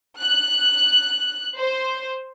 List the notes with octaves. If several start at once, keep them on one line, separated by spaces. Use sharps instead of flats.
F#6
C5